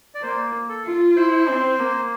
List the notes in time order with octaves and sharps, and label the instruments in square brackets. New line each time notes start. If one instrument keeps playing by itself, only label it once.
[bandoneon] D5
[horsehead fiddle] A#3 [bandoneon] C5
[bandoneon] A4
[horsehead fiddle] F4
[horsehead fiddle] E4 [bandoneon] C5
[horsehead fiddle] C4
A#3